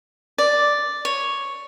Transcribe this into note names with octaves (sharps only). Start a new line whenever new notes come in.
D5
C#5